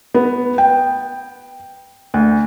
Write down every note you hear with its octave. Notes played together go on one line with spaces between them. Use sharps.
B3
G5
D2